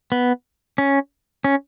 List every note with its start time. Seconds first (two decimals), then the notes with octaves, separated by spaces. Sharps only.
0.12 B3
0.78 C#4
1.44 C#4